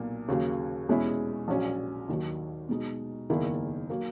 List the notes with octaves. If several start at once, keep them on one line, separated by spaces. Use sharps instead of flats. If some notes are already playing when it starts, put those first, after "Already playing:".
Already playing: B1 A#2 A#3
D#2 C#3 F#3 A#3
E2 B2 G#3 C#4 E4
A#1 A#2 F#3 C#4
D#2 D#3 F#3
B2 G#3 D#4
F#1 E2 D#3 A#3 E4
F#3 A#3